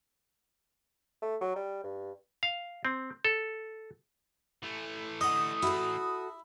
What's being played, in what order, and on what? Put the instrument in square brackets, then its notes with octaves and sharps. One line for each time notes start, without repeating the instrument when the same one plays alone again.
[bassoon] A3
F#3
G3
G2
[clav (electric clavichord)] F5
C4
A4
[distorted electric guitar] E3 A3
[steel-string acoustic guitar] D3 [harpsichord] D#5 F#5 [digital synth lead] D#6
[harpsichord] E4 [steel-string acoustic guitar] F#4 A4